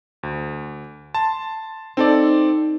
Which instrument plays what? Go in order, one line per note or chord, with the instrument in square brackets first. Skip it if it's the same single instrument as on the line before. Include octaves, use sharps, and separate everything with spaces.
[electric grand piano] D2
[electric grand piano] A5 [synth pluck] C6
[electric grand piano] C4 A4 D5 [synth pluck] D#4